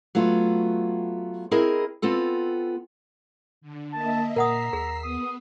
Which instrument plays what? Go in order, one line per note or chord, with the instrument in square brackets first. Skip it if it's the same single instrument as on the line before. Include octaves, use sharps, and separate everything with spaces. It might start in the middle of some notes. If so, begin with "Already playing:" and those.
[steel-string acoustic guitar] F#3 A3 B3 F4
C4 E4 G#4 A#4 D#5
B3 C4 F4 A4
[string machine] D3
[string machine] A#3 D#5 E5 [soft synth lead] A5
[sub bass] A#2 [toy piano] A#4 F#5 D#6 [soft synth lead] A#5 [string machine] E6 B6 C7
[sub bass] D#2 [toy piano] G#4
[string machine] B3 [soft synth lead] D#6